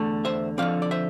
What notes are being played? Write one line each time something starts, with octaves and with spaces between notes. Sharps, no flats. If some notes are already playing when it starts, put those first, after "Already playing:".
Already playing: E2 D3 A3
C5 E5
D3 F3 C4 D5 F5
D5
C5 E5